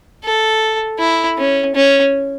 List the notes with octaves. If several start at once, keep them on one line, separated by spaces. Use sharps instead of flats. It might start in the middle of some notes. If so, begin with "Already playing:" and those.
A4
E4
C#4
C#4